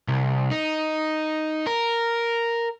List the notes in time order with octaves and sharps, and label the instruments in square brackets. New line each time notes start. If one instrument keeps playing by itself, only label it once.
[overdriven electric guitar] C2
D#4
A#4